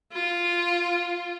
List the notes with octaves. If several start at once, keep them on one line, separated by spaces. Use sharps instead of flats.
F4